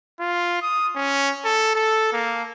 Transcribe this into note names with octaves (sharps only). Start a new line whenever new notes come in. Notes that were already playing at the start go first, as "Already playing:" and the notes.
F4
D#6
C#4
A4
A4
A#3